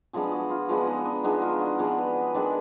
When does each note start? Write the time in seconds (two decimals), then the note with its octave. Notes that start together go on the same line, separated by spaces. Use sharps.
0.13 F3 G#3 B3 D4 G#4
0.32 F#4
0.50 F4
0.69 F3 G#3 B3 D4
0.87 D#4
1.05 D4
1.23 F3 G#3 B3 D4 D#4
1.42 F4
1.61 F#4
1.78 F3 G#3 B3 D4 G#4
1.98 B4
2.15 D#5
2.34 D#3 G#3 D4 D5